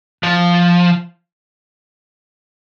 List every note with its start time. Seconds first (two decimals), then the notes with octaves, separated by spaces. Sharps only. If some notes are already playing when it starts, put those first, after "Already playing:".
0.23 F3